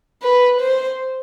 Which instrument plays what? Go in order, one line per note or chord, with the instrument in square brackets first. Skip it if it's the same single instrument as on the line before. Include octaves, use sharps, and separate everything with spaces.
[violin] B4
C5